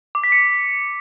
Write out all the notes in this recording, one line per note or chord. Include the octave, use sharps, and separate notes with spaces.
D6
B6
C#7